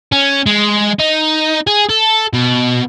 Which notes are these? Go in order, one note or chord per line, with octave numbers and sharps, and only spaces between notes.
C#4
G#3
D#4
G#4
A4
B2